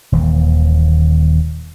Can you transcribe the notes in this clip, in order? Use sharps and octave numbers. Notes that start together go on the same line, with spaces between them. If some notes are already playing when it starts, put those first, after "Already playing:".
D#1 D#2 E3